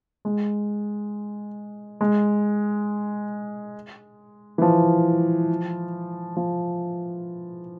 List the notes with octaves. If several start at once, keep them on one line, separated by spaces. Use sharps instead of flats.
G#3
G#3
E3
F3
F3